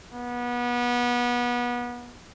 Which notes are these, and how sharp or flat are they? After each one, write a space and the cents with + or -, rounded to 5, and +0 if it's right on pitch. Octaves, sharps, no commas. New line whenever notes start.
B3 -25